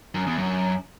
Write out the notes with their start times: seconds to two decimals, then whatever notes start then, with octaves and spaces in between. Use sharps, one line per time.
0.15 F#2
0.26 E2
0.38 F#2